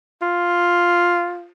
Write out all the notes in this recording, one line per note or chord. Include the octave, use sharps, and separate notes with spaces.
F4